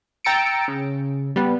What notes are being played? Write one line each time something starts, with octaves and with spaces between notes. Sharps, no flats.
G5 A#5 E6 A6 C#7 D7
C#3
G3 B3